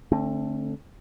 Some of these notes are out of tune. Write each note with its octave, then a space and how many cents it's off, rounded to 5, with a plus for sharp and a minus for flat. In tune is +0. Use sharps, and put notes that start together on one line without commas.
D3 -5 A3 +0 C4 +35